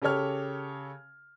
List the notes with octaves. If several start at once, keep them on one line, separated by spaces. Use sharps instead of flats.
C#3 G4 A4 C#5 F6